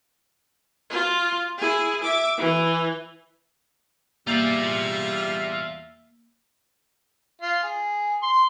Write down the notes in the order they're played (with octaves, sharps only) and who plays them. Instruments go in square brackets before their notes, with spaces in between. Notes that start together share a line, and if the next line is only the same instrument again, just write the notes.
[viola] F4
E4 G#4
E5 D6
E3
[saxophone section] E2 E5 [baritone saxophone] G3 [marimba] A#3 G6 A6 [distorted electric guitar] F4 D5
[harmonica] F4
G#4
C6